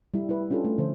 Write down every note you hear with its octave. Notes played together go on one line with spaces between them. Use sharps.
G3 E4
E4 B4
C#4 D4 F4 G4 A4
A3
D3 F3 C5